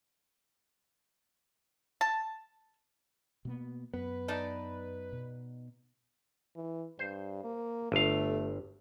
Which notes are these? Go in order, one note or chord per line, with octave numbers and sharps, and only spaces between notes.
A5
B2 A#3 B3
F#2 B3 B4
D#4 D5 A5
B2
E3
G2 C5
A#3
G1 A3 F5